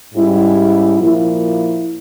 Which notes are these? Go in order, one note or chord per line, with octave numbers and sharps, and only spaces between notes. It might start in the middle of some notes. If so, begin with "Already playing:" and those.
G#2 G3 C#4 E4
A#2 F3 A#3 E4